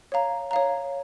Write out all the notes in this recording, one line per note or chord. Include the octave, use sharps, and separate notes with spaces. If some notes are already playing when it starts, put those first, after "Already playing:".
C#5 F5 A#5
C#5 F5 A#5